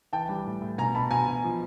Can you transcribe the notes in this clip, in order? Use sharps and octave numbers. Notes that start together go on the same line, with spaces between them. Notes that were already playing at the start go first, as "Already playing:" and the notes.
E3 G5 A5
G3
A2
A2
B2 G#5 A#5
B2 A5 B5
B2 G#5 A#5
B2
F3